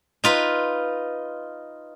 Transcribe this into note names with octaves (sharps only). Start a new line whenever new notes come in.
D#4 F4 B4